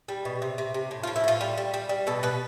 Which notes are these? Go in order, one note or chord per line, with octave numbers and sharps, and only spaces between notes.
G3
B2
C3
C3
C3
A2
F4
F3
E4
A2 F4
G3
G3
G3
G3
B2 A4
B2 B4